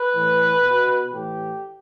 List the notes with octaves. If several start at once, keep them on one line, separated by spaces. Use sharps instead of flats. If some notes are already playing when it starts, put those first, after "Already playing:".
Already playing: B4
A2 E3
B2
A2 E3 G4